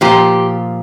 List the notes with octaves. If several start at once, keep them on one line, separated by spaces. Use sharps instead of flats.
A#2 F3 G4